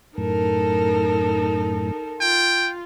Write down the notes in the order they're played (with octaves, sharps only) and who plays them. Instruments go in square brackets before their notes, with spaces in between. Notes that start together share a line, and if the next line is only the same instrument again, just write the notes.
[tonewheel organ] F#2 A2 [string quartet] D#4 A4 A#4
[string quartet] F4 [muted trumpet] G5